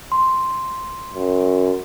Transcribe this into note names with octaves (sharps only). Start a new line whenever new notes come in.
C6
F#2